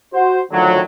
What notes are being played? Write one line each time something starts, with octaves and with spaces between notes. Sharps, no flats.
F#4 C5
A2 D3 D#3 F3 F#3